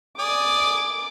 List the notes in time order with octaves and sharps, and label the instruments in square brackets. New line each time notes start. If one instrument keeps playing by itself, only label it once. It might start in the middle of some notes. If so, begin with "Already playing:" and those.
[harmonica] D5 G#5 D#6 [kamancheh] D6